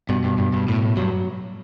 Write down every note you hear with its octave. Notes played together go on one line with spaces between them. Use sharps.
G2 B2
G2
G2
G2
A2
A2
G2 F#3